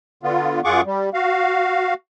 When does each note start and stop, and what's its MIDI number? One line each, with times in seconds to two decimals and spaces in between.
0.23 0.61 50
0.23 0.61 59
0.23 0.61 65
0.64 0.81 42
0.64 0.81 65
0.64 0.81 68
0.64 0.81 78
0.64 0.81 85
0.64 0.81 86
0.86 1.09 55
1.14 1.94 66
1.14 1.94 77